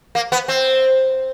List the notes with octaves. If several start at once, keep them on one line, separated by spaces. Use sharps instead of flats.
A#3
B3
C4